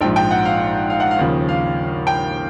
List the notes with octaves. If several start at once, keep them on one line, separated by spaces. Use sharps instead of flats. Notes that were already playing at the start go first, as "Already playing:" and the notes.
A#1 G#2 F3 G5
G5
F#5
F5
F5
F#5
F5
D#2 C#3 F3
F5
G5